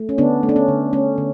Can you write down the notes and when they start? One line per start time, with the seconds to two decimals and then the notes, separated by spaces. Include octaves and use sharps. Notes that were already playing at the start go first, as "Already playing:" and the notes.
Already playing: A3
0.09 C#4
0.18 D3 B3 D4
0.43 A3
0.49 D4
0.56 C#4
0.68 D3
0.93 A3 C#4
1.18 D3